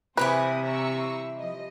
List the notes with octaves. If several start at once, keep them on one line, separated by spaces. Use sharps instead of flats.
C3 E3 G3 C4 E4 B4 C5 D#6
A#5 C#6 E6
F3 D#5